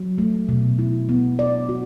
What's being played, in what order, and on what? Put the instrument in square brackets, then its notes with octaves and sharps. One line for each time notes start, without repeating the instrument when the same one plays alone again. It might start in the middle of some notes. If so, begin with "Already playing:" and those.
Already playing: [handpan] F#3
A3
B2
E4
B3
D5
F#4